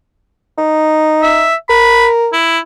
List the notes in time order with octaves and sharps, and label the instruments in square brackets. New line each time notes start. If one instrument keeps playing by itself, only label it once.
[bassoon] D#4
[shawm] E5
[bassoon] A#4 [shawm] B5
[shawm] E4